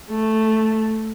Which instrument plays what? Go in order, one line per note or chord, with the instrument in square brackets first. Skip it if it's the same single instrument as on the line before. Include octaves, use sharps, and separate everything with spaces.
[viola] A3